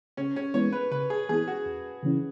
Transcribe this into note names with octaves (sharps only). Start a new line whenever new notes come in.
C#3 C#4
C#4
E3 G#3 B3 E4 C#5
B4
C#3 B4
G#4
E3 B3 E4 G#4
F#4
E2
C#3 E3 C#4 E4